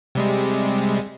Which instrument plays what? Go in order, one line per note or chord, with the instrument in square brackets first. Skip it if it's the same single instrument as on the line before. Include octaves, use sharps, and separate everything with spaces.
[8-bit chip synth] C3 G3 G#3